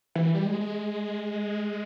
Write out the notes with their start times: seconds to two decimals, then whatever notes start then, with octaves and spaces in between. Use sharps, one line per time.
0.15 E3
0.34 G3
0.46 G#3
0.60 G#3